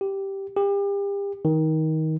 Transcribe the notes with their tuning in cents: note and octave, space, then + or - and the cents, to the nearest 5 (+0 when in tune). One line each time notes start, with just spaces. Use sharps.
G4 -5
G4 +35
D#3 +20